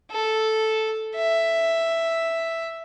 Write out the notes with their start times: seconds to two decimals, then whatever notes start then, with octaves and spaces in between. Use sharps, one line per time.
0.12 A4
1.16 E5